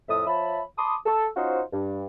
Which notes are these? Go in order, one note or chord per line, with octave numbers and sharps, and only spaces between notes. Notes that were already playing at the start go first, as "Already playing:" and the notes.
F2 A2 E5 D#6
F3 F4 C#5 E5 A5 B5
A5 B5 C6 D6 D#6
A4
C#4 D#4 F4 F#4 C5
G2